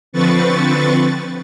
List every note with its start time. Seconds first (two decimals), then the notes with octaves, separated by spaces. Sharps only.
0.13 D3 F3 C4 B4 C#6 A6